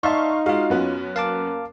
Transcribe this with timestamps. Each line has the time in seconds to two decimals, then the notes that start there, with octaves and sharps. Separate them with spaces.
0.03 D#4 D5 E5 F5 A5 C6 C#6
0.46 G#3 F4 F#4 F5
0.70 F#2 B3 C#4
1.16 A#3 F5 A5 D6